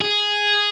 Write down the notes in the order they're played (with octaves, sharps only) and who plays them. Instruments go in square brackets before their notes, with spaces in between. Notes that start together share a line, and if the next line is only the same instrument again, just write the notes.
[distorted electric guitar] G#4